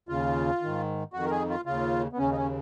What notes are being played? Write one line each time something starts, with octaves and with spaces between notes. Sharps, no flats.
D#2 C#3 F4
G#2 D#3
F2 D#3 F#4
A#4
G#4
F4
D#2 C#3 F4
B3
D#2 C#3 C#4
D#4
C#4